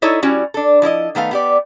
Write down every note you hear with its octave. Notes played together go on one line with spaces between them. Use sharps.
D#4 E4 A4 C#5 D#5
G3 C#4 E4 F#4
D4 A4
F3 E4 B4 D#5
D#3 A3 B3 F5
B3 G4 D5